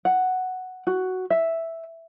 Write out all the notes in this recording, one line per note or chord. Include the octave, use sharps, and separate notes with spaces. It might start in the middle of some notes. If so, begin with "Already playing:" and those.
F#5
F#4
E5